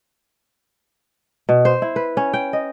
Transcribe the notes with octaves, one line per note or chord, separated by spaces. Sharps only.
B2
C5
E4
B4
C#4
G5
D#5